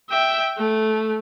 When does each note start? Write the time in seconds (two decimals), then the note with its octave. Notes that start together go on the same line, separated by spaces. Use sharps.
0.10 E5 G5
0.57 A3